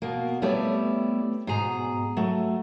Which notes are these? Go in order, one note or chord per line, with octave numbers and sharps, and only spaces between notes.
B2 A#3
G3 A3 B3 E4 C#5 D5
G#2 B2 G#4 A#5
F#3 A3